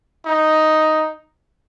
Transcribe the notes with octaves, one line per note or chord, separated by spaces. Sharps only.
D#4